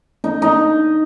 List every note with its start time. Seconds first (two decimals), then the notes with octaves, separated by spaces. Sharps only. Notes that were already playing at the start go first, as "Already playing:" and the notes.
0.24 D#4
0.42 D#4